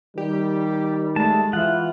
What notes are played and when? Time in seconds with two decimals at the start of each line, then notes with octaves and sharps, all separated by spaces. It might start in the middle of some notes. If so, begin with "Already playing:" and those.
0.18 D#3 G3 G4
1.16 G#3 A3 A5
1.53 E3 F4 F#5